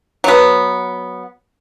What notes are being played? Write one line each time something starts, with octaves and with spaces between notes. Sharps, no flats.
F#3 B3